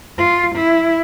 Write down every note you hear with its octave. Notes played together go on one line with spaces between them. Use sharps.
F4
E4